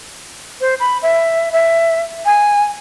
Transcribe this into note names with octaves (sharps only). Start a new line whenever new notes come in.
C5
B5
E5
E5
G#5